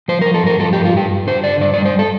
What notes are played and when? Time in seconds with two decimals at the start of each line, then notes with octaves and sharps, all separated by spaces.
0.08 F3 C5
0.22 A#4
0.26 F3
0.34 A4
0.42 G2 A#4
0.59 F3 A4
0.73 G2 G4
0.85 F4
0.94 G2 G4
1.11 G2
1.27 D3 C5
1.44 D3 D5
1.61 G2 D5
1.74 D5
1.78 G3
1.85 C5
1.99 A4